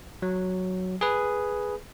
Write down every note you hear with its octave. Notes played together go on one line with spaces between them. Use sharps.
F#3
G#4 B4